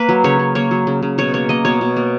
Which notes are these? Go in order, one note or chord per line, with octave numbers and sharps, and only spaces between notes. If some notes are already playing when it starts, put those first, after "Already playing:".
Already playing: A#3 B4
F#3
C#3 C#5
C#3
A#3 C#5
F#3
C#3
C#3
B2 C#5
A#3 C#5
A#3 D#5
B2 C#5
B2
A#3